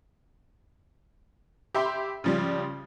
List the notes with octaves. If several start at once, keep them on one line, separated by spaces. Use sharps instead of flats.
G4 E5 B5 C6
C#3 F3 G3